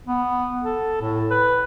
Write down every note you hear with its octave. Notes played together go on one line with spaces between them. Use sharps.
B3
A4
A2
B4